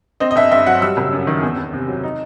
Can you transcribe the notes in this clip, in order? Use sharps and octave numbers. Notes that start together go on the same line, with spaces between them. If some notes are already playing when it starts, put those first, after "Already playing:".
C4 D#5
D#5
G1 E5
G2 E5
F#3 F#5
G3 E6
F#1
F#2
D#3
E2
E2
C3
F#3
D#4